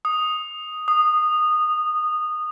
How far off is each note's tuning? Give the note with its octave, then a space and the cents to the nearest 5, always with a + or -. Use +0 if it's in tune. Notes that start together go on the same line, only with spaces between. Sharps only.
D#6 +0
D#6 -15